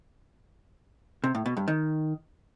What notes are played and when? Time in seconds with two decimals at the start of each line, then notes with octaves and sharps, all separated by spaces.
1.24 C3
1.35 A2
1.46 B2
1.57 G2
1.68 D#3